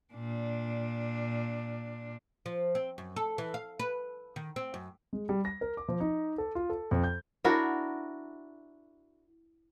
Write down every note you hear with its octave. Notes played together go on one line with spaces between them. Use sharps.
A#2 D4
F3
C4
F#2
A4
E3
F5
B4
D#3
C4
F#2
G#3
G3
A#6
A#4
D6
F3
D#4
A4
F4
A4
F2
G6
D4 E4 F#4 A#4